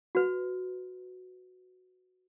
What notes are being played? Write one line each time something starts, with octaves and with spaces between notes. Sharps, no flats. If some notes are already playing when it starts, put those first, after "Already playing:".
F#4 B4